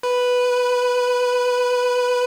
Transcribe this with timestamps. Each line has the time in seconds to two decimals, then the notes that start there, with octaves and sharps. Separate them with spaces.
0.03 B4